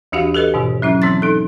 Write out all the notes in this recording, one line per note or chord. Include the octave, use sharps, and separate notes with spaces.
D#2 E3 D4 F#4 G4 F5
G4 A4 B4 D#5
G#2 B2 D#3 E3
F#3 C#4 E4
E3 C4 C6 A6
D#4 A4